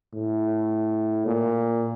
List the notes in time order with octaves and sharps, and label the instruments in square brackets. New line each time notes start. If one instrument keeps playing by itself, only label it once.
[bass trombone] A2
A#2